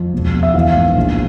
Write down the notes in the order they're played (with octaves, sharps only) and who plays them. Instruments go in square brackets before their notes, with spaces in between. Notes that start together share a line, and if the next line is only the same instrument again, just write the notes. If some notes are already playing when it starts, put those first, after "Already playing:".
Already playing: [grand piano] F2
E1
E1
E5
E3 F5
G#1
A#1